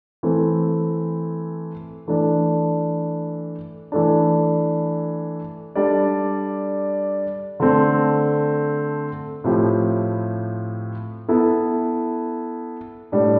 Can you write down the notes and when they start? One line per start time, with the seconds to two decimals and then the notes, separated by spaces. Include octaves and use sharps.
0.23 E3 A3 C4
2.08 E3 A3 D4
3.92 E3 A3 D4
5.75 G3 D4 A4 D5
7.60 D3 A3 C4
9.44 A2 F3 C4 E4 G4
11.28 B3 E4 A4
13.12 A2 G3 D4